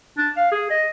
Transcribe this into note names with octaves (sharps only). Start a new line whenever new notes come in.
D4
F5
G#4
D#5